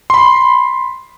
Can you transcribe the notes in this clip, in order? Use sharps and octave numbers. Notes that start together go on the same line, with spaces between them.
B5 C6